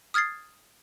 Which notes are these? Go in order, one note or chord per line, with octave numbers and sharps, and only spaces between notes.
D#6 F6 G#6 A6 C7